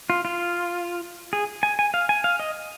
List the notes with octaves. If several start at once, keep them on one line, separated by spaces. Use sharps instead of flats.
F4
F4
G#4
G#5
G#5
F5
G#5
F5
D#5